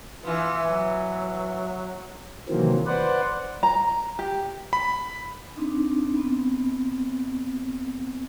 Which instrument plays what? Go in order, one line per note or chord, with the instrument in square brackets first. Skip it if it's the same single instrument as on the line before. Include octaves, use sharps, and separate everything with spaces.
[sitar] E3 B3 [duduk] F4
[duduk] F#3
[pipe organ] C3 D#3 E3 F#3 A#3 C4
B4 C5 D5 F#5
[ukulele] A#5
G4
[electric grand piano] B5
[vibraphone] C4 D4 D#4
B3 C4